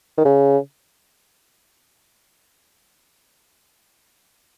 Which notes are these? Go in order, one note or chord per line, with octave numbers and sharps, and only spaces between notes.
D#3
C#3